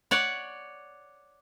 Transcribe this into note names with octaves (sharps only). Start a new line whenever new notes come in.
C#5 D5 F#5